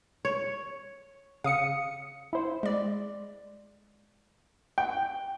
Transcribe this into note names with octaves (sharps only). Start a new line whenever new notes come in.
C#5
C#3 F5 D#6 C#7
E4 C5
G#3 D5
G5